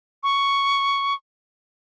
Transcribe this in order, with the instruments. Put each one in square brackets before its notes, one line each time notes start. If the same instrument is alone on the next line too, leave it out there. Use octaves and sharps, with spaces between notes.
[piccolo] C#6